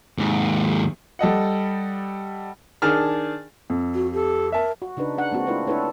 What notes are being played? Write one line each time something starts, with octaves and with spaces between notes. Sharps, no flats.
D#2 G#2
G3 A4 D#5 F#5
D#3 D4 G#4 A5 F6
F2
F#4
G4 A4
A#4 E5 A5
F#4
C#3 D4 D#4 B4
D4 F#5
G#3 A#3 C4 F#4
A3 D4 E4 F4 B4
D4 E4 A4 B4 C#5